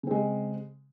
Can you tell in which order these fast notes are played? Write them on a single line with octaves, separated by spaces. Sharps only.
C#3 C4 G#3